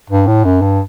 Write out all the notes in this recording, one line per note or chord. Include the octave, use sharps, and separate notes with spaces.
G2
A2
F#2
G2